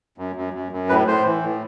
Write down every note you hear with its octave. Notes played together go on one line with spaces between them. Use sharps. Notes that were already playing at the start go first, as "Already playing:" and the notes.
F#2
F#2
F#2
F#2
A2 B4
A2 C5
E3
A2